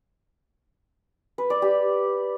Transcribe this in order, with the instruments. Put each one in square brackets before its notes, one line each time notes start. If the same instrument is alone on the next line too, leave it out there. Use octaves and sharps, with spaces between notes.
[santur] B4
D5
G4